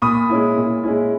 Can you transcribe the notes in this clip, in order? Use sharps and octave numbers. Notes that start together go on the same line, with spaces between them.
A#2 B5 D#6
G#3 C#4 E4
A#2
G#3 C#4 E4